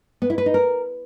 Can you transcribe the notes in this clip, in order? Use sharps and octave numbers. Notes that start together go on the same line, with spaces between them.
B3
E4
B4
D#4
A#4